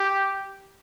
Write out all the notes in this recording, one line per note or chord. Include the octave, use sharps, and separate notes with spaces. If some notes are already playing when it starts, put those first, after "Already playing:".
Already playing: G4